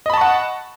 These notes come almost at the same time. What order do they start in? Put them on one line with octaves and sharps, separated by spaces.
D#5 B5 A5 C#6 F#5